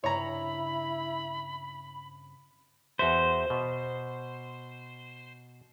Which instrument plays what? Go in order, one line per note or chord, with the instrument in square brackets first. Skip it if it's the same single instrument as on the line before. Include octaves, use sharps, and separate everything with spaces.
[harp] G2 C#3 C4 [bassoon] E4 [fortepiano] C#5 A#5 [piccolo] B5
[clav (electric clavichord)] E2 F#4 E5 [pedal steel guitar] C5
[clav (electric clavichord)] B2